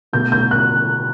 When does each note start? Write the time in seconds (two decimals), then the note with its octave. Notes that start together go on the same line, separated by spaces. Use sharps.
0.13 B2 A3 G6
0.32 G6
0.51 F#6